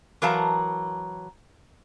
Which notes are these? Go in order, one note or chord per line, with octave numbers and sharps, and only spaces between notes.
E3 F#3 A#4 F5 A5 A#5